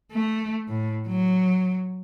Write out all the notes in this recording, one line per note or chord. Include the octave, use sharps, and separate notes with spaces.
A3
A2
F#3